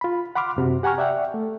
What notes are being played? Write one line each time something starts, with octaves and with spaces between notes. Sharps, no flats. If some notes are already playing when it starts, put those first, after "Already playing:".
F4 B5
F#5 B5 C6 D6 F6
F#2 C3 F#4
G4 F#5 G#5 A#5 C#6 F6
D5 E5 F#5 G5
A3